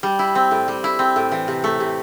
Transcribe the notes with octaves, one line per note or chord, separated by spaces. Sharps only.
G3
E4
C4
A2
G3
E4
C4
A2
E3
C3
A3
C3